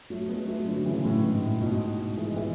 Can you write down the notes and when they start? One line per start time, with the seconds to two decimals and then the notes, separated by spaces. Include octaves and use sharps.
0.10 F#3 A3
0.29 G#3 B3
0.47 F#3 A3
0.66 D3 F#3
0.85 C#3 E3
1.05 A2
1.23 G#2
1.42 A2
1.61 G#2 B2
2.17 E3 G#3
2.36 E3 G#3